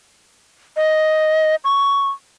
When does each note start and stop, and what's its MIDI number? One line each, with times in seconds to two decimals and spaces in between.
0.77 1.55 75
1.64 2.09 85